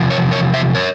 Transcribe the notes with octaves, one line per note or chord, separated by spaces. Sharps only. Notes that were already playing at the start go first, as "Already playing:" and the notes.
Already playing: E2 C3 F3
A#4 C#5
A#4 C#5
C5 E5
F3 A#4 C#5